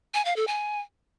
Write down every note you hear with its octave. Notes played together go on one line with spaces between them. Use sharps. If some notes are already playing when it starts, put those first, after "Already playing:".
G#5
F5
A4
G#5